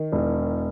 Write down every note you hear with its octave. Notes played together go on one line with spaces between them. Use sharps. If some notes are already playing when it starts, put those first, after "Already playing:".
Already playing: D#3
E1